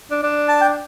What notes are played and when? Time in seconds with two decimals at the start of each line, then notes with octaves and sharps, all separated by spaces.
0.10 D4
0.23 D4
0.48 A5
0.61 G5